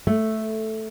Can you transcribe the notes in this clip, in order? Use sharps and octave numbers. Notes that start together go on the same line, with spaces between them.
A3